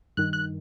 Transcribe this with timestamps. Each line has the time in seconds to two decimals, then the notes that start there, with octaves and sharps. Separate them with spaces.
0.17 G2 D#3 F#6
0.33 F#6